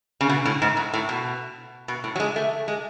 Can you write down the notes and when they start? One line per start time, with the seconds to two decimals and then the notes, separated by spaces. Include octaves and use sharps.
0.21 C#3
0.29 B2
0.45 A2
0.62 G#2
0.77 A2
0.93 A2
1.09 B2
1.88 B2
2.04 A2
2.16 F#3
2.20 G#3
2.36 A3
2.68 G#3